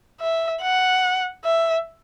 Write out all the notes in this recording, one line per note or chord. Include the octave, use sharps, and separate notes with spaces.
E5
F#5
E5